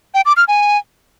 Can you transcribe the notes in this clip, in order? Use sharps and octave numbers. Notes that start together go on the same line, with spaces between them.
G5
D6
F6
G#5